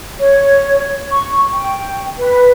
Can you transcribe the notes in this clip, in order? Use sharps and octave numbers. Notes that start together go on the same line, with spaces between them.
C#5
C#6
G5
B4